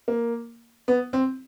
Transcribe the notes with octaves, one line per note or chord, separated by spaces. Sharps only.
A#3
B3
C4